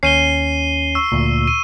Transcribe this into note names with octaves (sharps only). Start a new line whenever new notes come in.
D#2 C#4 C#5 C7 D#7 G7
C#6 E6
D2 A#2
D#7